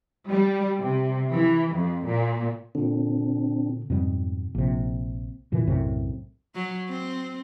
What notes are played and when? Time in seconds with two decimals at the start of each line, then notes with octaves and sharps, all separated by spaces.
0.30 G3
0.80 C3
1.33 E3
1.74 F2
2.06 A#2
2.75 A#2 D3 C4 D4
3.90 F2 G#2 B2 G3
4.55 A#1 C3
5.52 F1 A#2 D#3 E3
5.67 B1 F#2 A2 C3
6.55 F#3
6.88 C4